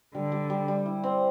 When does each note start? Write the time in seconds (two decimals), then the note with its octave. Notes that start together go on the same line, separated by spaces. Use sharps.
0.14 D3 G3
0.32 G3
0.50 G3
0.68 G3
0.86 E4
1.04 C4